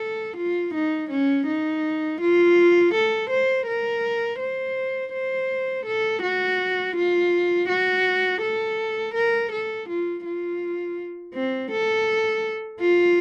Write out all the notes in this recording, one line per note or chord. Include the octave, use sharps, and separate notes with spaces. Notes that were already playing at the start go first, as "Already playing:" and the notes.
Already playing: A4
F4
D#4
C#4
D#4
F4
A4
C5
A#4
C5
C5
A4
F#4
F4
F#4
A4
A#4
A4
F4
F4
C4
A4
F4